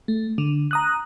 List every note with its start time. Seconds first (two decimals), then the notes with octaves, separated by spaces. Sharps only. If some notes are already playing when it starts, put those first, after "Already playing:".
0.08 A3
0.38 D3
0.71 A#5 D#6 F#6